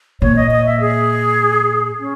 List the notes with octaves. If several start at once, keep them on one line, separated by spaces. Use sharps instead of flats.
A#2 C#5
D#5
D#5
E5
G#4
C#4